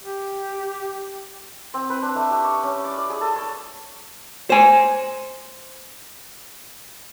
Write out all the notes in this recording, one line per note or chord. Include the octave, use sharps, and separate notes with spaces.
G4
C4
B4
D4
A3
G4
C#6
C#4
D5
D5
G#4
A4
C#5
C5 G#5